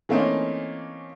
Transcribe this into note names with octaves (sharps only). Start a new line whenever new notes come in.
E3 A3 A#3 C4 C#4 D#4